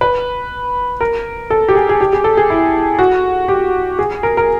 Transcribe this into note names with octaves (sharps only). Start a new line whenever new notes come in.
B4
A#4
A4
G4
G#4
G#4
G4
G#4
A4
G#4
E4
F#4
G4
G#4
A#4
A#4